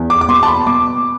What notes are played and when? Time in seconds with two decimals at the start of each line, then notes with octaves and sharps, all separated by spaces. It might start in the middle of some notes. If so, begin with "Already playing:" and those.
Already playing: E2
0.10 D6
0.21 D6
0.28 B2 C6
0.43 A5
0.48 B5
0.67 B2 D6